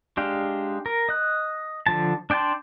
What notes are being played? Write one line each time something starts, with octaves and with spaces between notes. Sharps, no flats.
G#3 D4 G4 F5
A#4
D#5 F#6
D3 F3 A5
D4 D5 G5 A5 C6